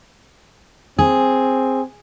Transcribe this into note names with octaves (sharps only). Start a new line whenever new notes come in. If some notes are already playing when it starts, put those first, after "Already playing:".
C4 G#4